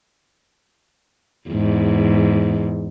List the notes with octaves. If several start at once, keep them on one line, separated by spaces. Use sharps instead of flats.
E2 G#2